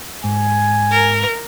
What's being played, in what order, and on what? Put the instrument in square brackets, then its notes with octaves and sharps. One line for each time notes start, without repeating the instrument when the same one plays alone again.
[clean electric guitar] G#2 [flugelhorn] G#5
[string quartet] A#4